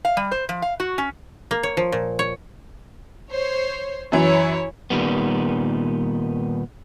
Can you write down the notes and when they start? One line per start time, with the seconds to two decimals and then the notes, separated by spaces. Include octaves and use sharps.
0.05 F5
0.17 G3
0.31 C5
0.49 F3
0.62 F5
0.80 F#4
0.98 C#4
1.51 A#3
1.63 C#5
1.77 F3
1.92 A#2
2.19 C#5
3.30 C5 C#5
4.12 F#2 E3 E4 C#5
4.90 A#2 D#3 G3 B3